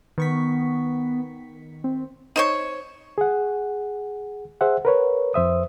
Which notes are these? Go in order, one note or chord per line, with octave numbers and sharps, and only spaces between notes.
D#3 B3 C#6 B6
C4
D#4 C5 C#5
G#4 F#5
G#4 C5 E5 F#5
A#4 B4 C#5
F2 C5 E5 D#6